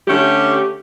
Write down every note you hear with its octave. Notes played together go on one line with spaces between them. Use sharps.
D3 A3 C#4 G4